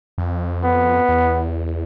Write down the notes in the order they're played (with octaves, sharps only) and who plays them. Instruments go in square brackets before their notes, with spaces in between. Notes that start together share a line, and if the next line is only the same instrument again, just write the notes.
[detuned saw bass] F2
[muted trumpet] B3
[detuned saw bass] E2